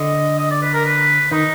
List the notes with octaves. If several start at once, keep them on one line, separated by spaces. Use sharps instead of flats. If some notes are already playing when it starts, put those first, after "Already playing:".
Already playing: D3 D#5
D#5
D5
B4
A#4
B4
D#3 D#4